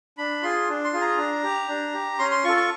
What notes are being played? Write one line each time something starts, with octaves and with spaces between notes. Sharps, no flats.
D4 B5
F4 G#4 C6
D4
C6
F4 G#4
A#5
D4
G4
D4
G4
C#4 C6
C6
F4 A4 C#6
C#6